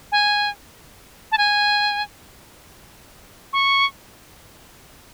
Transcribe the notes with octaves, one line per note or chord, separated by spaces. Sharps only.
G#5
A5
G#5
C#6